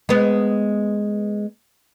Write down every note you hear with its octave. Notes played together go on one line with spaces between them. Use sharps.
G#3 B3